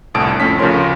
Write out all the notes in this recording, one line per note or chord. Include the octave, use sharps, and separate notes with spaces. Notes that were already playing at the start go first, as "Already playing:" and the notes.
G1 C2 A2 A5 D#6 D7
F2 A3 C#4 B6
D2 C#3 F3 A#4 C#5 C6